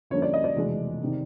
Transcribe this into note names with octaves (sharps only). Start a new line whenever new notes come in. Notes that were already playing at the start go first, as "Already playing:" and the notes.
F2 D3 G3 A#3 C#4 C#5
D5
D#5
D5
F1 E2 B2 G#3
C3 D#3